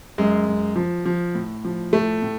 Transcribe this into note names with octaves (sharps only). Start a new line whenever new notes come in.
F#2 G#3
F#2
F3
F3
A2
F3
A2 A3
A2